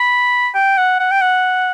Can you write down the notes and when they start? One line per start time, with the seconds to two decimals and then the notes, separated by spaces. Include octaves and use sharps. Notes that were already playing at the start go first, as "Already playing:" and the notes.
Already playing: B5
0.54 G5
0.77 F#5
1.00 F#5
1.11 G5
1.21 F#5